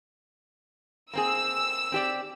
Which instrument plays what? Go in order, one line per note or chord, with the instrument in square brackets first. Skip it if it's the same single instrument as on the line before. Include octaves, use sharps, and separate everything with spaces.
[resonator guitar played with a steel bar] A#3 C4 G#4 [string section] E6
[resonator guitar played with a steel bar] C4 G4 D5